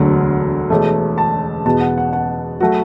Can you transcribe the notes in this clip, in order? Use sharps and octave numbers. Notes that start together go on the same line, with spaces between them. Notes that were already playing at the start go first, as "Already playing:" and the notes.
Already playing: E1 D2 D3 F#3
E1 E2 B2 A3
A5
E2 B2 B3 A5
F#5
F#5
F#5
F#3 A3 F#4